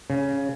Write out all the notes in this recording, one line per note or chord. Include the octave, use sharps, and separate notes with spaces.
C#3